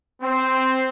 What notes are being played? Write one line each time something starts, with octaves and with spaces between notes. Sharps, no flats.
C4